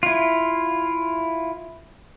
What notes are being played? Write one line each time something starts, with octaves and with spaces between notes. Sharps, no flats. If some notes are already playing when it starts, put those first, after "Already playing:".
E4 F4